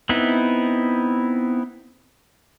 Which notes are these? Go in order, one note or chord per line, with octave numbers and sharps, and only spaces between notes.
B3 C4 D#4 E4